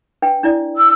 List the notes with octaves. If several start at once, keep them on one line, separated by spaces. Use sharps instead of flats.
D4 B4 G5
D4 E4 D5
E6